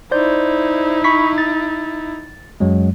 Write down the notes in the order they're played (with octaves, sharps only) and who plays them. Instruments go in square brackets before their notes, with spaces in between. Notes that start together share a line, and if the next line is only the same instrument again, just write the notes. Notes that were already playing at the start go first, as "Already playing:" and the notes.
[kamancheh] D#4 E4 [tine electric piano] C5 D5 G6
[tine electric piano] B5 C#6 B6
A6
F#2 F#3 G#3